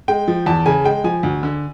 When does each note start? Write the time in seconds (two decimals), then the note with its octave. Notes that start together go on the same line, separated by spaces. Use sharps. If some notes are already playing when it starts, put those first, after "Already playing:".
0.08 G#3 G5
0.28 F3
0.46 E2 A5
0.66 C#3 G#5
0.84 G#3 G5
1.04 F3 G#5
1.23 D2
1.43 D3